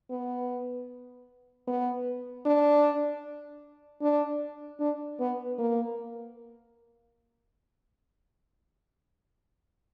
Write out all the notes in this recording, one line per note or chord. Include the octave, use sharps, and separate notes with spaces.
B3
B3
D4
D4
D4
B3
A#3